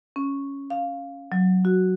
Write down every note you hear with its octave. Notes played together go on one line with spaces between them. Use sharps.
C#4
F5
F#3
F#4